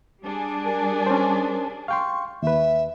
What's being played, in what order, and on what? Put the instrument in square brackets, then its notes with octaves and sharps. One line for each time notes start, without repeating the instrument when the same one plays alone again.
[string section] G3 D4 G#4
[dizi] A#4
[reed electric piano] C#4 C5
[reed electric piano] F5 G5 C6 [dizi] C#6
[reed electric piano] D#2 B4 [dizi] E5